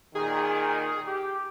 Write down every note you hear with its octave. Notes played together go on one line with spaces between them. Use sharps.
A#2 D#3 G#4
G4